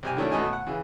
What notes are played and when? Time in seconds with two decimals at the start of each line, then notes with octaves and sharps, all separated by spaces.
0.03 C2 G4 G#5
0.17 D#3 F#3 A3 C#4 D4 E4
0.31 F#2 B2 A3 D#5 G#5
0.53 F#5
0.66 C#3 E3